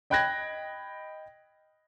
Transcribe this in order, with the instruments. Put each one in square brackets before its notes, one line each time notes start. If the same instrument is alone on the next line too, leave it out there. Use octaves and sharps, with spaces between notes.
[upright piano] D#5 G5 B5 F#6 G#6 A#6